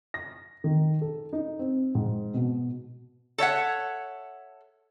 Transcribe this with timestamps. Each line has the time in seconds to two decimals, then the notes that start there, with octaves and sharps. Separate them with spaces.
0.14 A#6
0.64 D#3
1.01 A4
1.33 D#4
1.59 C4
1.95 G#2
2.34 B2
3.38 A4 C#5 E5 F#5